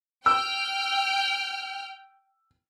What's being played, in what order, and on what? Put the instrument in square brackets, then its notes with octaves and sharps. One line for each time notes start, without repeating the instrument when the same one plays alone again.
[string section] G5 F6 [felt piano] E6